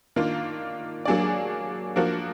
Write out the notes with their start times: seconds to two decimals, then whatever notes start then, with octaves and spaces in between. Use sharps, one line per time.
0.16 D#3 A#3 D4 F4
1.05 F#3 A#3 D4 G#4 D5
1.96 F3 A#3 D4 F#4 A#4